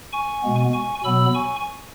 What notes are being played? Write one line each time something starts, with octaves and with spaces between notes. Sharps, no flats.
G#5 C#6
B2 G#3 B3
G#5 C#6
B2 F#3 B3 B5 E6
G#5 C#6